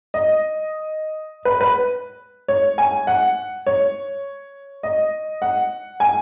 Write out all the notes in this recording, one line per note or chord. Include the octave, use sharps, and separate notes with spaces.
D#5
B4
B4
C#5
G#5
F#5
C#5
D#5
F#5
G#5